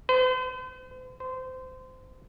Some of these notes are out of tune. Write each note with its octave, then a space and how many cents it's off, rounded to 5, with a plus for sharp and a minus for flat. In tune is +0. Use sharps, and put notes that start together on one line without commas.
C5 -45
C5 -25